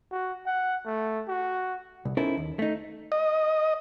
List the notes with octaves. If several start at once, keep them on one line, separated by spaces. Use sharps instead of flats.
F#4
F#5
A3
F#4
C2
C#4 D#4 E4 A4 A#4 C5
D#2
A3 D#4
D#5